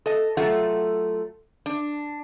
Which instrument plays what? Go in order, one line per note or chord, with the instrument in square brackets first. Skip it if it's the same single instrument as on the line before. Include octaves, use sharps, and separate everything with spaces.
[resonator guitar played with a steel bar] A4 D#5
F#3 A3 F4 A4 F#5
D4